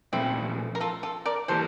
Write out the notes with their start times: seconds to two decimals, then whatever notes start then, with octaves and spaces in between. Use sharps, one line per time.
0.13 A#2 F3 A3 C4 E4
0.75 A#4
0.81 F4 A4
1.03 F4 A4
1.26 A#4 D5
1.48 E3 G3 A#3 A4 C5